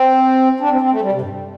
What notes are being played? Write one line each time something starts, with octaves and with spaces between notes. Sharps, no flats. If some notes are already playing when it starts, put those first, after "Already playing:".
Already playing: C4
D4
C4
C4
A3
G3
C3
G2